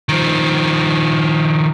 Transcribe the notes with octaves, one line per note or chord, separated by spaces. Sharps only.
D#3 F3